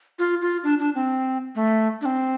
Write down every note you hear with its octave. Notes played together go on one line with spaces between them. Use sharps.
F4
F4
D4
D4
C4
A3
D4
C4